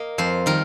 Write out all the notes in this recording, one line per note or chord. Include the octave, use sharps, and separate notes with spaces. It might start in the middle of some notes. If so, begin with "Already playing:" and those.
Already playing: A#3 D#5
F2 C5
D#3 G3 A#4